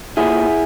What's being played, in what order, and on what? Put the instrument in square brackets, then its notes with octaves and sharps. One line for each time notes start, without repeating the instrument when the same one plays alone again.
[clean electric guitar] A#2 E4 G#4